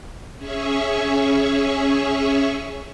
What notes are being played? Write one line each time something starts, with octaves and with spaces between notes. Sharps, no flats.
C#4 G#4 E5 C#6